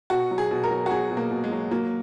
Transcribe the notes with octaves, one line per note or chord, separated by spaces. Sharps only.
B2 F#4
F#3
G#4
B2
A#4
F#3
F#4
F#3 G#4
B2
A#3
B2
G#3
F#3
F#3 A#3